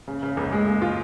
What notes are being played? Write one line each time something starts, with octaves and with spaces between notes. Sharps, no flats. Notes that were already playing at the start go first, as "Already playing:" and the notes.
C#3
C#3
C#2
G#3
G#3
F4